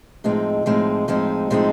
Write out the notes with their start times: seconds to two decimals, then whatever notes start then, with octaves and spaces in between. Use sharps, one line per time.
0.24 A2 F3 G#3 C4 D#4
0.66 A2 F3 G#3 C4 D#4
1.08 A2 F3 G#3 C4 D#4
1.50 A2 F3 G#3 C4 D#4